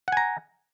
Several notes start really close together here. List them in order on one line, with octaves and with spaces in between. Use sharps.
F#5 G#5 A#5